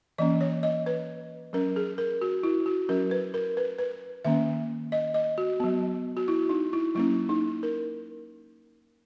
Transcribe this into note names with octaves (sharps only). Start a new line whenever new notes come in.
E3 A#3 C#4 D#5
C#5
D#5
B4
F#3 C#4 A#4
G#4
A#4
F#4
E4
F#4
F#3 C#4 A#4
B4
A#4
B4
B4
D#3 A#3 C#4 E5
D#5
D#5
F#4
F#3 B3
F#4
E4
D#4
E4
F#3 A#3 C#4 E4
D#4
A#4